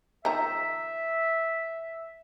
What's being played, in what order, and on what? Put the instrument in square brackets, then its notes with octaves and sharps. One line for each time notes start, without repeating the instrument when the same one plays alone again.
[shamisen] D#3 F3 A#5 [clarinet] E5